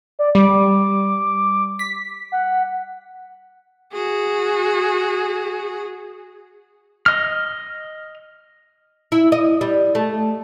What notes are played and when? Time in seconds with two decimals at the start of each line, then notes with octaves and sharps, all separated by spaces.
0.19 D5
0.35 G3 D6
1.79 B6
2.32 F#5
3.92 F#4 G#4
7.06 D#5 F6
9.12 E4
9.32 D#5
9.61 G3
9.95 A3